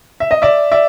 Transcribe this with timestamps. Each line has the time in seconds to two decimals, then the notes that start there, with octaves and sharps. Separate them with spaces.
0.20 E5
0.31 D#5
0.42 D5 E5
0.72 D5 E5